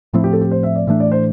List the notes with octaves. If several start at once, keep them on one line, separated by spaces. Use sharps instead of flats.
A2 F3 A3 C4 E4
G4
A4
G4
C5
E5
D5
A2 E3 A3 D4 E5
D5
C5